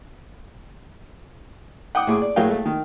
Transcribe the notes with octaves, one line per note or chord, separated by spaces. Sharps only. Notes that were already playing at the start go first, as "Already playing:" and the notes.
F#5 G5 D6 D#6
A2 G#4 D6
D5
A2 F#3 A#3 G#4 F5 G5
A3
D#3